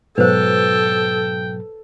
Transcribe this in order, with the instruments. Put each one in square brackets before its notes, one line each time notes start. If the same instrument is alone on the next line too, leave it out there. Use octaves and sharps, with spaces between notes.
[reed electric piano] G#2 B2 F#3 [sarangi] A4 [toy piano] B4 C5 [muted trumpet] G5